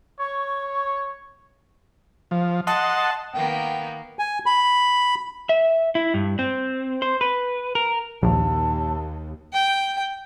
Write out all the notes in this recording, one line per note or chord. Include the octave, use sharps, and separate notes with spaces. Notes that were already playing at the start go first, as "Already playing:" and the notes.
C#5 C#6
F3
D#5 F#5 A5 C6
D#3 A#3 B3 G5
G#5
B5
E5
E4
G2
C4
C5
B4
A#4
A#1 D#2 A5
G5